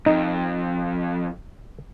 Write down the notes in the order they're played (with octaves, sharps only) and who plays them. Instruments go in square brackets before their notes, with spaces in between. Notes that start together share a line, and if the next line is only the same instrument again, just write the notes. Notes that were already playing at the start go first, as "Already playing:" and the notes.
[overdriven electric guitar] F2 [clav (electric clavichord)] D#4